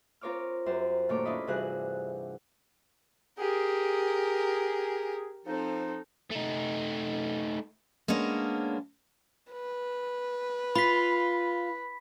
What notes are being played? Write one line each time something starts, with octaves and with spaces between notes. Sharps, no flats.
C4 F4 A#4 C#5 D6 F6
F#2 G4 C5
A#2 D#3 A3 C#5 C#6 D6
C#4 D4 E4 F4 D#5 B5
G2 C3 E3 F#4 G#4 F#6
G4 G#4 A#4
F3 C4 D#4 A4
A3 D#4
G#3 A#3 B3 C#4 D4
B4
F4 B5 B6